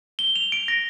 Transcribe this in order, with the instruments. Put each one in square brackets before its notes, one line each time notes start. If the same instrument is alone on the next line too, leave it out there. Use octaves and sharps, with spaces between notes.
[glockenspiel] G7
F7
D7
A#6